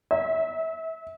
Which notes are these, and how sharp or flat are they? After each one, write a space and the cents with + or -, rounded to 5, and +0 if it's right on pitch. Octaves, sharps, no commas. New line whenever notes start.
E5 -25